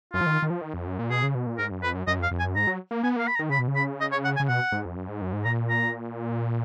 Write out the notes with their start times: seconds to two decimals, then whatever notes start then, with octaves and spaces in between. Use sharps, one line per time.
0.13 F#2 F4
0.21 F3
0.26 D#3
0.42 D#3
0.50 F3
0.61 D#3
0.74 F2
0.87 F#2
0.99 A#2
1.10 B2 G#4
1.23 C#3
1.35 B2
1.47 A#2
1.58 G#2 A#4
1.71 F#2
1.83 F2 B4
1.94 F#2
2.07 F#2 D#5
2.19 F2
2.23 F5
2.31 F2
2.39 G#5
2.43 F#2
2.55 G#2 A#5
2.67 F#3
2.91 A#3
3.03 B3 G#5
3.16 A#3 F5
3.27 B5
3.35 A#5
3.39 D#3
3.50 C#3 B5
3.59 B2
3.68 C#3
3.76 B5
4.01 D#5
4.12 C#5
4.25 F#5
4.36 G#5
4.40 C#3
4.48 B2 F#5
4.72 G#2
4.85 F2
4.96 F#2
5.08 G#2
5.22 F#2
5.33 G#2
5.44 A#2 A#5
5.69 A#5